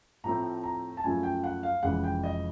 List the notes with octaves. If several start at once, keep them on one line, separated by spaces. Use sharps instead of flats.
A2 F3 A3 C4 A#5
A#5
A5
F#2 C#3 F3 A3 G#5
G5
F#5
F5
F1 F2 C#3 E3 G#3 F#5
G5
D#5